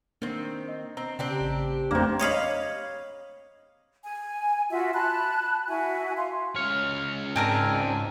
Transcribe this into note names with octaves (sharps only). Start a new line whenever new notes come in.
D#3 A#3 C4 D4
D#5
C4 A#5
C#3 C4 D4 G4
A1 A#5
F2 C3 A3 A#3 D4 E7
C#5 D#5 F5 B5
G#5
F4 F#4 E5
A5 B5 F#6
E4 F#4 E5 G#5
F5 C6
C#2 C#5 F6
G#2 C4 D4 A#4 G#5